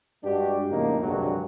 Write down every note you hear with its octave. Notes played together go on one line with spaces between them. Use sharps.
G2 G#3 D4 F#4 G4
F2 A2 C#3 A3 A#3 D#4
C2 G2 D3 D#3 F#3 G#3